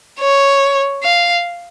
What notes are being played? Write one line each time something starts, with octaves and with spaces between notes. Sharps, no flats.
C#5
F5